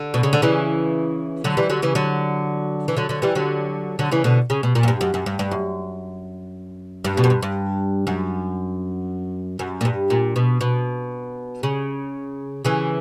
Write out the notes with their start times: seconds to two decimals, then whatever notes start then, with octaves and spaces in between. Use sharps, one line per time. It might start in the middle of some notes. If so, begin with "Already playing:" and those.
Already playing: D3
0.14 B2
0.23 C#3
0.33 D3
0.42 C#3 E3
1.44 D3 F#3
1.57 E3 G3
1.70 D3 F#3
1.82 C#3 E3
1.95 D3 F#3
2.88 E3
2.97 D3 F#3
3.09 D3 F#3
3.22 E3 G3
3.35 D3 F#3
3.99 D3 F#3
4.11 C#3 E3
4.24 B2 D3
4.50 C#3
4.63 B2
4.75 A#2
4.83 F#2
4.88 G2
5.01 F#2
5.14 F#2
5.26 G2
5.39 G2
5.51 F#2
7.04 G2
7.17 B2
7.24 F#2
7.30 G2
7.43 G2
8.07 F#2
9.59 F#2
9.81 A#2
9.85 G2
10.10 A#2
10.36 B2
10.61 B2
11.63 C#3
12.65 C#3 E3